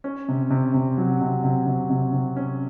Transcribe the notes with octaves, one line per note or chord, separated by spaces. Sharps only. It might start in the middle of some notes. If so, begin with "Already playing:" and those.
C#4
C3
C3
C3
F#3
C3
C3
C3
C3
C3
C#4